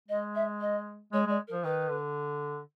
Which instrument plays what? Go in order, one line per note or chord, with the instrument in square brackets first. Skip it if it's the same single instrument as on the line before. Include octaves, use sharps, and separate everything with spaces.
[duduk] G#3 [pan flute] D#5
[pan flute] E5
D#5
[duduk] G#3 [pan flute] C#5
[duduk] G#3 [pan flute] D5
[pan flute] A#4
[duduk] F3
[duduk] D#3 [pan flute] B4
[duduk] D3